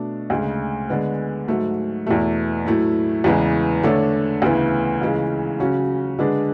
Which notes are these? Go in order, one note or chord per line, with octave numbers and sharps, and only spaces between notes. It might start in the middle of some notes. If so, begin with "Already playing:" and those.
Already playing: B2 A3 D4
D2 C#3 G#3
D3 G#3 B3
G#2 F#3 A3
E2 B2 A3
A2 F#3 A3 E4
E2 C#3 E3 G#3 B3
D3 A3 D4 A4 C#5
D2 C#3 E3 B3 E4
C#2 C#3 E3 G#3
C#3 F#3 C#4 F#4
D3 G#3 D4 G#4 B4